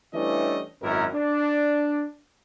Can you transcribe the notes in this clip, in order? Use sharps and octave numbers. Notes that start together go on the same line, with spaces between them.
E3 G3 A3 C#4 D4 D#5
G#1 F#2 E4 A#4
D4